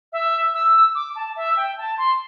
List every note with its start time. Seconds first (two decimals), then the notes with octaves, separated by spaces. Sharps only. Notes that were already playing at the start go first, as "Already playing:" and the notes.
0.13 E5
0.54 E6
0.95 D6
1.15 A5
1.36 E5
1.57 G5
1.78 A5
1.98 C6